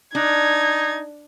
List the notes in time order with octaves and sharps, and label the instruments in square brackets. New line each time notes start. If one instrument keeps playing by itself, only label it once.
[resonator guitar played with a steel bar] D4 [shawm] D#4 [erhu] G#6